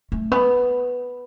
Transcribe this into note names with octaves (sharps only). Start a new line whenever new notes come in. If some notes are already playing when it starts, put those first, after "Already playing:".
A3
B3